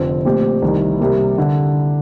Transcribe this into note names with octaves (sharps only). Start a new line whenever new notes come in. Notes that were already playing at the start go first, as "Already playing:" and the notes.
Already playing: F1 F2 D3 F3 C4
A#2 A3 C4 G4
C2 C3 D#3
C3 G3 A#3
D3